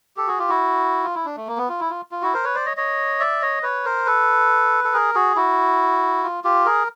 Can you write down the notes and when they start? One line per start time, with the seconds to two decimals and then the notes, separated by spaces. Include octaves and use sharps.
0.17 G4 A4
0.27 F#4 G#4
0.39 F4 G4
0.49 E4 F#4
1.04 F4
1.15 E4
1.25 D4
1.37 A3
1.47 A#3
1.57 B3
1.69 F4
1.80 E4
1.90 F4
2.11 F4
2.22 E4 F#4
2.34 A#4 C5
2.44 B4 C#5
2.55 C5 D5
2.66 C#5 D#5
2.77 C#5 D#5
3.20 D5 E5
3.42 C#5 D#5
3.63 B4 C#5
3.85 A#4 C5
4.06 A4 B4
4.84 A4
4.93 G#4 A#4
5.15 F#4 G#4
5.36 E4 F#4
6.23 F4
6.44 F4 G4
6.66 G#4 A#4